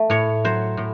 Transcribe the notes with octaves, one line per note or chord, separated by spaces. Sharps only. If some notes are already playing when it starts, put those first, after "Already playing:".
Already playing: A3 E5
A2 C#5
F#3 C5
A2